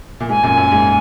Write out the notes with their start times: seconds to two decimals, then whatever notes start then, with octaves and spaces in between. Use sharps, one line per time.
0.20 A#2
0.29 G#2 G#5
0.43 F#2 A#2
0.57 F#2
0.72 G#2